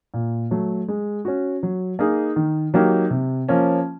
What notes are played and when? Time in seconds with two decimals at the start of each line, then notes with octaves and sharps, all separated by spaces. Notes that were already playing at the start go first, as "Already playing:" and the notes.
0.14 A#2
0.51 F#3 A3
0.88 G#3
1.25 C#4 F#4
1.63 F#3
1.99 A#3 D#4 G#4
2.36 D#3
2.74 F#3 A#3 D#4 G4
3.10 C3
3.48 F3 A#3 C#4